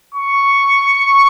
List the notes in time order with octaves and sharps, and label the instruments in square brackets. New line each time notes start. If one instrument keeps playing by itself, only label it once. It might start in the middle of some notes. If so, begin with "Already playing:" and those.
[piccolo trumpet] C#6